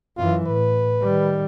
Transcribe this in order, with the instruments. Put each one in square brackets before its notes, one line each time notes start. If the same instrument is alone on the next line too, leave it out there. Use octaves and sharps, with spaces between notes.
[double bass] F#2 E3 [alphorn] F4
[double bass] A2 [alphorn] B4
[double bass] D#3 G3